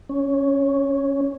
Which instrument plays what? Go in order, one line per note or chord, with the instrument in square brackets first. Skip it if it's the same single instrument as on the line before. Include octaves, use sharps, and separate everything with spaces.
[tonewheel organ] C#4